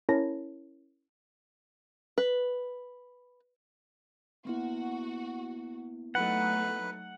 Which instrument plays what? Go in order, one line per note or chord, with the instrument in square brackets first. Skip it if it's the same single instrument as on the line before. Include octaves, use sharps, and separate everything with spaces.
[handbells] C#4 E4 A#4 C#5 A5 A#6
[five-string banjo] B4
[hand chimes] A#3 B3 E4 [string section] F#4
[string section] F#3 A3 D#4 [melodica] B4 [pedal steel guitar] F#5